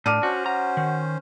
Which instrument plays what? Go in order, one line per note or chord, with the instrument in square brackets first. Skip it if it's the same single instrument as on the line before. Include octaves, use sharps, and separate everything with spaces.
[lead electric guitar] A2 [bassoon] D4 [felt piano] D6 F6 D#7
[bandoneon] C#4 C5 [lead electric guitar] F#4
[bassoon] F#4 [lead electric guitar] A#5
[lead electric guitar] D#3